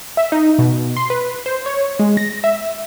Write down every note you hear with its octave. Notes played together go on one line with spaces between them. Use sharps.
E5
D#4
B2
C6
B4
C5
C#5
G#3
A#6
E5